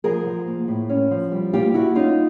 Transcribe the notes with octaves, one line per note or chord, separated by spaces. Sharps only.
F3 G#4 A#4
F3
A#3
A2
C#4
F3
G3
A#3 F4 G4
A#3 E4 F#4
C#4 D#4 F4